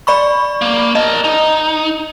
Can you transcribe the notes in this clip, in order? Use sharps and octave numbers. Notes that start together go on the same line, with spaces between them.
D5 B5 C#6
A#3
A#4 D#5 A5
D#4